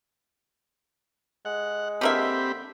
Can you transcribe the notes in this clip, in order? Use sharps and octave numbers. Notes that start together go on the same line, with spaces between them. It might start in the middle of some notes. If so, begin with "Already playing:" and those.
G#3 F#5
D3 A#3 C4 G4 E5 B5